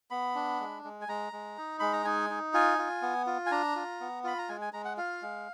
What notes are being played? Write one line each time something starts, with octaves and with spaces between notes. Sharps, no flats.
B3 B5
D4
G#3
G#3
G#5
G#3 A#5
G#3
D#4
G#3 B5
A#5
D#4 G#5
D#4
F4 G#5
F4
B3
F4
G#5
D4 A#5
F4
B3
F4 B5
A#5
G#3 G#5
G#5
G#3 A#5
F#5
F4 F5
G#3